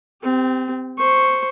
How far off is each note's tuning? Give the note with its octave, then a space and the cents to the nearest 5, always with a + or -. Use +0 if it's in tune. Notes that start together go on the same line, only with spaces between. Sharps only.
C4 -25 G4 +15
C5 +0 C#6 -5